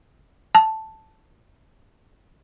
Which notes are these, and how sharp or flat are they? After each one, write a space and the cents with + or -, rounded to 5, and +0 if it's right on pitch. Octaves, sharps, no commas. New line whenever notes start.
A5 +0